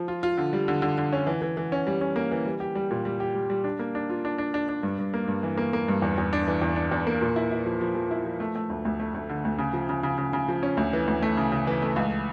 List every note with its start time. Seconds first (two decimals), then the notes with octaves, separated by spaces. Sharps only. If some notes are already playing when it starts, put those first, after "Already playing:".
Already playing: F3
0.08 F4
0.23 F4
0.38 D3
0.53 G3
0.68 D3
0.82 D3
0.98 D3
1.13 C#4
1.27 E3
1.42 E3
1.57 E3
1.72 C#4
1.87 G3
2.01 C#4
2.16 A#3
2.31 E3
2.46 G3
2.60 G4
2.75 G3
2.91 A#2
3.05 G3
3.20 G4
3.35 G3
3.50 G3
3.64 D4
3.79 A#3
3.95 D4
4.10 F4
4.25 D4
4.38 D4
4.54 D4
4.69 D4
4.83 G2
4.99 G2
5.14 A#3
5.28 G2
5.43 E3
5.57 A#3
5.73 A#3
5.88 G2
6.02 E2
6.18 E2
6.33 D4
6.47 E3
6.62 E2
6.76 D4
6.91 E2
7.07 A#3
7.21 A#2
7.36 E4
7.51 E4
7.66 F3
7.81 F3
7.95 F3
8.11 E4
8.25 F3
8.40 A3
8.55 A3
8.70 D2
8.85 D2
9.00 A3
9.14 D2
9.29 D3
9.45 D2
9.58 C#3
9.73 F3
9.89 C#3
10.03 C#3
10.18 C#3
10.33 C#3
10.48 F3
10.63 C#4
10.77 D2
10.93 E3
11.07 D2
11.23 A3
11.37 C#3
11.52 C#3
11.67 E3
11.82 A3
11.96 C#2